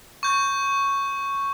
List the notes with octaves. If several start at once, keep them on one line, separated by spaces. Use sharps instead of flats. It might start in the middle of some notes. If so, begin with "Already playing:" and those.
C#6 G6